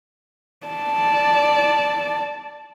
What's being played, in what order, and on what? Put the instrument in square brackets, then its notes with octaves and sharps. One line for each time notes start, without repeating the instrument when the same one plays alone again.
[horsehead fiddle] D5 A5